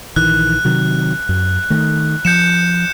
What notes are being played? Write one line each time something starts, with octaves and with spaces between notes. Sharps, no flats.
A#1 D#3 E3 F#6
C3 D#3 F#3
F#2
D#3 A3
F3 G6 C#7 E7